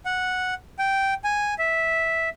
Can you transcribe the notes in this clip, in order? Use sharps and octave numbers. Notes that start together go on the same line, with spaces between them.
F#5
G5
G#5
E5